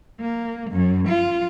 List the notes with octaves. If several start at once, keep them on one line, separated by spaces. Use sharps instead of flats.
A#3
F#2
F4